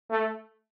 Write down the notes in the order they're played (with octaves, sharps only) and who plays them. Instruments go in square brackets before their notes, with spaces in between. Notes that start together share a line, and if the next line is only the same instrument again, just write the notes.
[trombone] A3